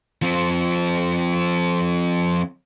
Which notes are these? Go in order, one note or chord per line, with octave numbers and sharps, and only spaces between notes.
F3 C4